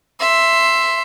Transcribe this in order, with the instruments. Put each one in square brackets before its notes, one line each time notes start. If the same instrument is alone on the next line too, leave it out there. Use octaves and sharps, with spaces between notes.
[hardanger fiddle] E5 C6